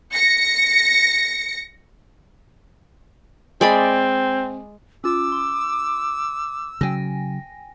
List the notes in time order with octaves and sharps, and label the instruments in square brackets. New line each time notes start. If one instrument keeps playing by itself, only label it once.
[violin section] A#6 C#7
[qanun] G#3 D5 B5 [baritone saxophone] C4
[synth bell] C#4 F4 [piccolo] D6 [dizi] E6
[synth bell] C6
[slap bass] C#3 F#3 [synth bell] G5 G#5 A#6